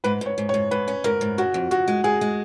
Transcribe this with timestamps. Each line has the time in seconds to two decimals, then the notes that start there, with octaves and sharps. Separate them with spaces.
0.04 G#2 B4
0.21 G#2 C#5
0.38 G#2
0.49 C#5
0.54 G#2
0.71 G#2 B4
0.88 C#4
1.04 G#2 A#4
1.21 G#2
1.38 C#3 F#4
1.54 F2
1.71 F2 F#4
1.88 G#3
2.04 G#3 G#4
2.21 G#3